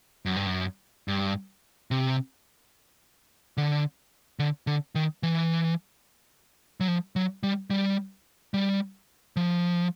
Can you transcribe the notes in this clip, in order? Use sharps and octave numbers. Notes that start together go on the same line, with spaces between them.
F#2
G2
F#2
G2
C3
D3
D3
D3
D#3
E3
F#3
F3
F#3
G3
G3
G3
F3